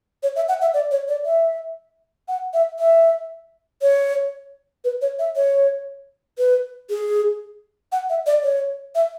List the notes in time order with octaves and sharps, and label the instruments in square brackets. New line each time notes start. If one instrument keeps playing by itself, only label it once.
[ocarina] C#5
E5
F#5
E5
D5
C#5
D5
E5
F#5
E5
E5
C#5
B4
C#5
E5
C#5
B4
G#4
F#5
E5
D5
C#5
E5